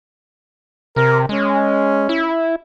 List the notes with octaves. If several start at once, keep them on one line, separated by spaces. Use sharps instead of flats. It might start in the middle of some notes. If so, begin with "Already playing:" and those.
C3 A#4
G#3 C#4
E4